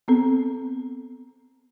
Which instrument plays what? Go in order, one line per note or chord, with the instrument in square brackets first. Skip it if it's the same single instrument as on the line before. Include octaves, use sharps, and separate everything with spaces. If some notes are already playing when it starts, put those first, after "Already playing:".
[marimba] B3 C4 A4